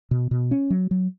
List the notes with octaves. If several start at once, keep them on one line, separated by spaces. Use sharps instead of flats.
B2
B2
C#4
F#3
F#3